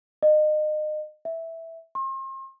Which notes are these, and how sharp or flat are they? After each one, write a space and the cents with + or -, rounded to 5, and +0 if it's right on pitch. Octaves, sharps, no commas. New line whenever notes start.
D#5 -30
E5 -5
C6 +40